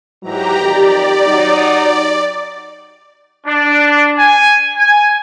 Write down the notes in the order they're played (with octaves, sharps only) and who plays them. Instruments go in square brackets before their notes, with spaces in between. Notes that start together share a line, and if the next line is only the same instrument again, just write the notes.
[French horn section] G#2 E3 F#3 [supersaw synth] G4 A#5
[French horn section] F2 D#3 G4 [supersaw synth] D5
[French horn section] F#3 D#4
[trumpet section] D4
G#5
G#5